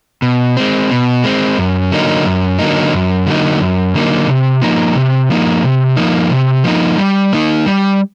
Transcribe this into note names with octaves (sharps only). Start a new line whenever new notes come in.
B2
G#3 C4
B2
G#3 C4
F#2
D3 F#3 A#3 D#4
F#2
D3 F#3 A#3 D#4
F#2
D3 F#3 A#3 D#4
F#2
D3 F#3 A#3 D#4
C3
F3 A#3 D#4
C3
F3 A#3 D#4
C3
F3 A#3 D#4
C3
F3 A#3 D#4
G3
A#3 D#4
G3